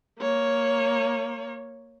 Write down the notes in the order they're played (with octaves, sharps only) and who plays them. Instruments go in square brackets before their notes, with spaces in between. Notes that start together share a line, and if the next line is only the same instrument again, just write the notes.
[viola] A#3 C#5